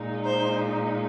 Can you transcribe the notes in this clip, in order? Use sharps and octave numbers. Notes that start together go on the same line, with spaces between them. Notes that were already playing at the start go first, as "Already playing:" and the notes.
Already playing: A#2 G#3 D#4
C5